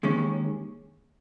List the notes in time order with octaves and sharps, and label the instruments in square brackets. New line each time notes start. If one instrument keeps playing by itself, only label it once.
[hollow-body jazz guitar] D#2 D#3 G#3 C#4